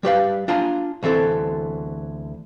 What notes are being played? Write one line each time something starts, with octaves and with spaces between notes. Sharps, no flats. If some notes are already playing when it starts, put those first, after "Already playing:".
G3 G4 B4 F5
D4 F4 G#5 A#5
D2 E3 C4 A4